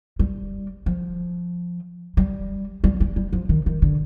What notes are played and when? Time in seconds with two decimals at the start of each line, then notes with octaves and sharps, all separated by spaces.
0.19 G3
0.86 F3
2.17 G3
2.84 G3
3.00 G3
3.16 G3
3.33 F3
3.49 D#3
3.66 D#3
3.82 D3